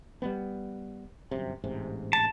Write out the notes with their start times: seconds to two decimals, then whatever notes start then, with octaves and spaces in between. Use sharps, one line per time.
0.22 G3 A#3 B3
1.31 G1 F#2 C3
1.64 A1 G#2 C3
2.13 A5